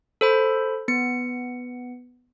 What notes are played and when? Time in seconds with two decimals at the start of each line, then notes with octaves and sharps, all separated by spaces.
0.21 A4 C5 B5
0.88 B3 C#7